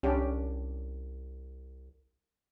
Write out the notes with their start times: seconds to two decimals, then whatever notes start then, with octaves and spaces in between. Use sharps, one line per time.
0.03 C2 C#4 D4 G4